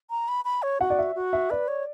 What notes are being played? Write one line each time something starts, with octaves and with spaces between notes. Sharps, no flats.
A#5
B5
B5
C#5
F#4 F#5
D5
E5
F#4
E5
B4 D5
C#5